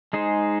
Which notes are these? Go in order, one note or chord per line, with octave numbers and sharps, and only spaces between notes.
G#3 D#4 G#4 C5